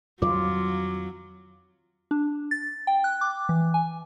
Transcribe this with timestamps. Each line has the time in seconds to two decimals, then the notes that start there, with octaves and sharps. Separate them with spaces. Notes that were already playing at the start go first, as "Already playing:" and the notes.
0.22 F2 D#3 F#3 G3 F4 D6
2.11 D4
2.51 A6
2.87 G5
3.04 F#6
3.21 D6
3.49 E3
3.74 G#5